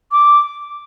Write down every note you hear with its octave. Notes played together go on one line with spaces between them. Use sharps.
D6